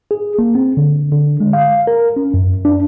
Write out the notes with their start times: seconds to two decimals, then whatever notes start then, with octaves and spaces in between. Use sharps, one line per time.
0.11 G#4
0.39 A#3
0.55 C4
0.77 D3
1.12 D3
1.40 G#3
1.53 F5
1.87 A#4
2.16 C#4
2.34 F#2
2.65 D4